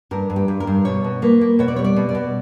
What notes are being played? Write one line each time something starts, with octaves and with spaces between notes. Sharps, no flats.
G2 A#4
G2
G4
G2
A#4
G2
B2 C#5
B2
A#3 B4
A#3
B2 C#5
D5
G3 C#5
D5
B2
D5
B2